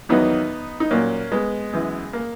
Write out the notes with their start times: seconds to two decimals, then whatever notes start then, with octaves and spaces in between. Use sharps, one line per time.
0.09 E2 D#3 F#3 B3 D#4
0.80 D#4
0.91 A#2 F#3 A#3 C#4
1.32 G#3 B3
1.73 F#2 E3
2.13 A#3